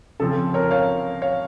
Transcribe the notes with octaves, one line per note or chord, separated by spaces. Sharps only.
C#3 F3 C4 A4
A#4 C#5
C#5 F5
C#5 F5